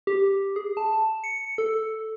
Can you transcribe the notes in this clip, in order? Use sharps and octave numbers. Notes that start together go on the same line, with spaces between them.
G4
G#4
A5
C#7
A4